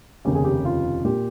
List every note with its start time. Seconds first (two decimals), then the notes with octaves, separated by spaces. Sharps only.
0.25 F1 D#2 C#3 G4
0.35 G#4
0.44 G4
0.65 F4
1.04 A#2 G4